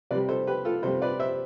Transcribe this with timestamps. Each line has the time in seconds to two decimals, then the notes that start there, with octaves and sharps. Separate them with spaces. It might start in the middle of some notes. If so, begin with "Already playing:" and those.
0.11 C3 G3 B4 D5
0.29 A4 C5
0.47 G4 B4
0.65 F4 A4
0.83 C3 G3 A4 C5
1.02 B4 D5
1.20 C5 E5